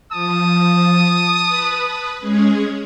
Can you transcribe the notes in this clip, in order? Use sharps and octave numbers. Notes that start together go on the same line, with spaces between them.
F3 A5 D#6
B4
G#3 C#4 G#4